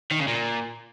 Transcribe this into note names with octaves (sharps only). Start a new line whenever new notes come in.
D#3
C#3
A#2